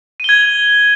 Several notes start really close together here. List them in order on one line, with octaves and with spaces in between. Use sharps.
D#7 G7 G#6